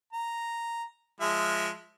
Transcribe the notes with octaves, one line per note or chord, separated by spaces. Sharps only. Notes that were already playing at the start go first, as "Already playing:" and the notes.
A#5
F3 G#3 E5